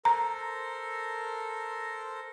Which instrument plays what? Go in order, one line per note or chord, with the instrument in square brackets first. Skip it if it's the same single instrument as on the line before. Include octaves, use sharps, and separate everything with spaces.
[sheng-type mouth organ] A4 A#4 C5 [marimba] A#5